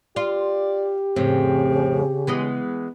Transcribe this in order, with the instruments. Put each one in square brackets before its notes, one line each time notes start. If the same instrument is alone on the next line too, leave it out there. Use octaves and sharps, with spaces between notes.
[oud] F4 [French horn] G4 [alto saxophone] D5
[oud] F2 A2 [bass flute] C#3 [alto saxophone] C4
[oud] E3 G#3 D#5 [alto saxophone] B3